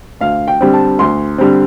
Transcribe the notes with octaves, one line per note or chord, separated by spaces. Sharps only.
D2 F5
G5
D3 G3 C4
A5
D2 C6
D3 G3 C4